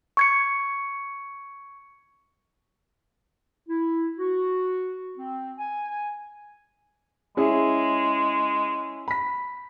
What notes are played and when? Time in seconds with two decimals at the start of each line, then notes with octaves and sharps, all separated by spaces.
0.17 C#6 G#6 C#7
3.68 E4
4.18 F#4
5.17 C4
5.58 G#5
7.37 G#3 C#4 E4 G#4
9.08 B5 B6